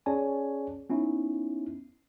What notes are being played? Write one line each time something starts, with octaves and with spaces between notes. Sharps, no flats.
C#4 G#4 C#5 D5 G#5 A5
B3 C#4 D#4 E4